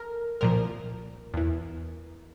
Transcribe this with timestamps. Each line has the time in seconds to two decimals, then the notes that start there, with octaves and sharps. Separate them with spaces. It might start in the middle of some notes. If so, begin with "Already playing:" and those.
Already playing: A4 A#4
0.41 C2 A#2 F3 A#4
1.34 E2 E3